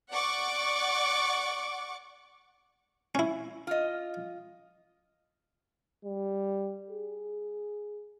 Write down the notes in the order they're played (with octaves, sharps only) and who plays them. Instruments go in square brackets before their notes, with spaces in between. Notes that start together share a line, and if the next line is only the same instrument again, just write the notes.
[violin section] D5 F#5 C#6 D6
[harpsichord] C#4 E4
[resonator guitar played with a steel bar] F4 D#5
[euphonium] G3
G#4